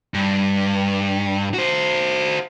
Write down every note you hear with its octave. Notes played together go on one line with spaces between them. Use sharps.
G2
F#4 C5